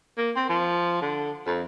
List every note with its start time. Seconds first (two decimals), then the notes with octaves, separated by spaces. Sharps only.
0.18 A#3
0.36 C4
0.49 F3
1.02 D3
1.46 F2